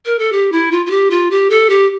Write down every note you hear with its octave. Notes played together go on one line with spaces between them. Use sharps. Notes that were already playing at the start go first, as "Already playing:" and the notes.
A#4
A4
G4
E4
F4
F4
G4
F4
G4
A4
G4